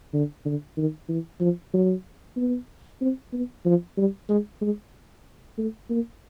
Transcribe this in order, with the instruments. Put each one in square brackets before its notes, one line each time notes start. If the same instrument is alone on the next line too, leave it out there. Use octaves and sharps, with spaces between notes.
[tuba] D3
D3
D#3
E3
F3
F#3
B3
C4
B3
F3
G3
G#3
G#3
A3
A#3